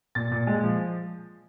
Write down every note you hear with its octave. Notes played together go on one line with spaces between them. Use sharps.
A#2 A6
A#2
G#3
F3